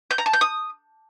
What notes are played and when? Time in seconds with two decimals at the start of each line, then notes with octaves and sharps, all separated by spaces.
0.11 G6
0.18 A#5
0.26 A5
0.33 G6
0.41 D#6